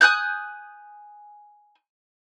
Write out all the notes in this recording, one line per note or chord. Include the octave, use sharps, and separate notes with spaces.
G#5 D#6 F#6 G6